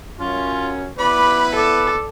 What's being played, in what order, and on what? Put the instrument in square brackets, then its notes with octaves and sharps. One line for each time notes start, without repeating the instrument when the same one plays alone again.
[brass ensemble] F#2 C#4 [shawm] F4
[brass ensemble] B3 E4 B4 [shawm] D5 [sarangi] B5
[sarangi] A4 [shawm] D5